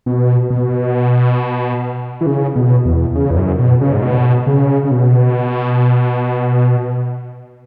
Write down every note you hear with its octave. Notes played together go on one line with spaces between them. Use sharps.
B2
B2
E3
C#3
B2
E2
C#3
E2
F#2
B2
C#3
G#2
B2
C#3
C#3
B2